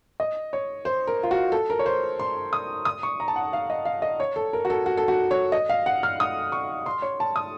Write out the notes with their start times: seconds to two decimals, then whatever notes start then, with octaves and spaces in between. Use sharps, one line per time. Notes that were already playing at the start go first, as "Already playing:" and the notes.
0.20 D#5
0.53 C#5
0.85 C5
1.07 A#4
1.23 F4
1.31 F#4
1.52 A4
1.70 A#4
1.79 C#5
1.86 C5
2.19 C6
2.53 D#6
2.85 D#6
3.03 C#6
3.20 A#5
3.28 A5
3.36 F#5
3.53 F5
3.70 D#5
3.85 F5
4.02 D#5
4.20 C#5
4.36 A4
4.53 A#4
4.65 F#4
4.70 A4
4.86 F#4
4.97 A4
5.08 F#4
5.31 C#5
5.52 D#5
5.69 F5
5.86 F#5
6.03 F6
6.20 D#6
6.52 C#6
6.86 C6
7.02 C#5
7.20 A5
7.36 D#6